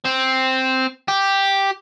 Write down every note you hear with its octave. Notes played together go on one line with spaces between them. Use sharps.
C4
G4